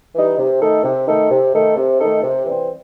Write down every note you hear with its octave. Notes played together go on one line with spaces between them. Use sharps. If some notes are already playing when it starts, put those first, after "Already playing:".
E3 G3 D#4
C3
D#3 A3 D#4 A4
C3
D#3 A3 D#4 A4
C3
D#3 A3 D#4 A4
C3
D#3 A3 D#4 A4
C3
E3 G3 C4